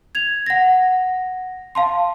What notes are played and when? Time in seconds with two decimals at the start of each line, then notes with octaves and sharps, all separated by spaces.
0.15 G#6 F7
0.46 F#5 A#6
1.75 F5 A5 C6